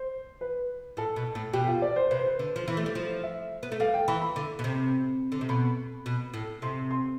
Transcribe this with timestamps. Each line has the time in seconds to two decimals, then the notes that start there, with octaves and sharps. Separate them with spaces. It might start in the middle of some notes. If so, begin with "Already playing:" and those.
Already playing: C5
0.41 B4
0.97 A2 A4
1.16 B2
1.35 A2
1.53 B2 G4
1.68 F4
1.82 D5
1.96 C5
2.11 C3 B4
2.19 C5
2.27 B4
2.39 D3
2.56 F3
2.68 E3
2.77 A3
2.86 G3
2.95 F3
3.23 E5
3.63 B3
3.72 A3
3.80 G3 F5
3.94 G5
4.08 E3 B5
4.22 B5
4.36 D3
4.59 B2
4.64 C3
5.32 D3
5.41 C3
5.49 B2 B5
6.06 B2
6.34 A2
6.62 C3 C6
6.91 C6